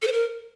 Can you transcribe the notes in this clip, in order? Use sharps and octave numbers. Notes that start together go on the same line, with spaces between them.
A4
C5
A#4